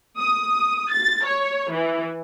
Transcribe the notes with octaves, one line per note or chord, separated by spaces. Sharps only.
D#6
A6
C#5
E3